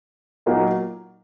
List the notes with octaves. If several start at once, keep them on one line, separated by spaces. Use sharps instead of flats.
A#2 F#3 A#3 D#4